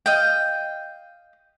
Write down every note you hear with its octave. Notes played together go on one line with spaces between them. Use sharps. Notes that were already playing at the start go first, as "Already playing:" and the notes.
D#5 F5 G5